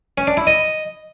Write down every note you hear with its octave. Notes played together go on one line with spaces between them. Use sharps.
C#4
D4
E4
D#5